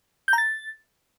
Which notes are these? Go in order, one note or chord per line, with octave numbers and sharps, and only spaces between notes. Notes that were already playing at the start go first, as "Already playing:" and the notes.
G6
A#5
A6